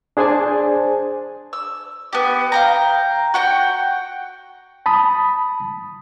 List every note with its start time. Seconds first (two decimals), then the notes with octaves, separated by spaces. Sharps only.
0.17 D4 G#4 C5 D5 G#5 A5
1.53 E6
2.13 B3 G4
2.52 F5 G5 A#5
3.34 F#4 F#5 G5
4.86 A5 B5 D#6